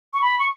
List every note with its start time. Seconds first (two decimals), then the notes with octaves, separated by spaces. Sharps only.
0.14 C#6
0.22 B5
0.39 C#6